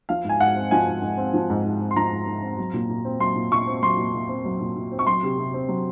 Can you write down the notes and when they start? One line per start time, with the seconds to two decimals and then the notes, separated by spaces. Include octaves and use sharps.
0.09 F3 F5
0.24 G#2 G#5
0.40 G#2 F#5
0.56 C4
0.71 F3 G#5
0.86 G#2
1.02 G#2
1.18 C4
1.34 F3
1.50 G#2
1.64 G#2
1.80 C4
1.91 C6
1.96 F3 A#5
2.12 G#2
2.27 G#2
2.42 C4
2.57 F#3
2.74 A#2
2.89 A#2
3.05 C4
3.20 F#3 C6
3.36 A#2
3.51 A#2 C#6
3.67 C4
3.82 F#3 C6
3.98 A#2
4.14 A#2
4.29 C4
4.45 F#3
4.61 A#2
4.76 A#2
4.92 C4
4.99 C#6
5.07 F#3 C6
5.23 C3
5.38 C3
5.54 C4
5.69 F#3